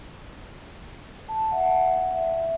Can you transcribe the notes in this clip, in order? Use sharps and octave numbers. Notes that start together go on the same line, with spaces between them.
A5
E5 F#5
E5